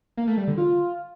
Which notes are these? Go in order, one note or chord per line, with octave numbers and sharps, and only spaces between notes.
A#3
A3
G3
D3
F4